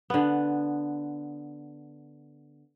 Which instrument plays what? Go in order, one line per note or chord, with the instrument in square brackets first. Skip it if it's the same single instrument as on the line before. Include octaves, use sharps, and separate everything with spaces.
[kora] D3 B3